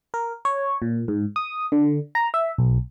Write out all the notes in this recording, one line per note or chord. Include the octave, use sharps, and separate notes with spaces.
A#4
C#5
A#2
G#2
D#6
D3
A#5
E5
B1